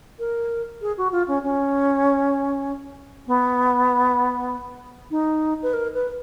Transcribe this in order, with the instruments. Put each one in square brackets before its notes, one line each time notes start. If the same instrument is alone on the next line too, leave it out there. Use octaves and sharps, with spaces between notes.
[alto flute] A#4
G#4
F#4
F4
C#4
C#4
B3
D#4
B4
A#4
B4